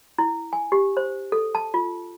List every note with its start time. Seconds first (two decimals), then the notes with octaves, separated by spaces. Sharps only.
0.18 E4
0.53 G#5
0.72 G4
0.97 C5
1.32 A4
1.55 A5
1.74 F4